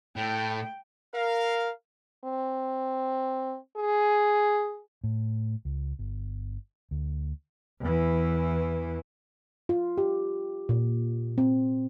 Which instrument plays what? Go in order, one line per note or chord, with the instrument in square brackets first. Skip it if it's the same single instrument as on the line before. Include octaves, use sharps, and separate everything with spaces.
[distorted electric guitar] A2 [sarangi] G5
[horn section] A#4 F5
[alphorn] C4
G#4
[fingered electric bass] A2
C#2
G1
D2
[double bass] E2 E3
[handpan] F4
G4
A#2
C4